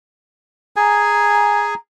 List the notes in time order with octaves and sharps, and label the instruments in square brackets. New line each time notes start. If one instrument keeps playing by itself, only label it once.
[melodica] G#4 G#5 [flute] A#5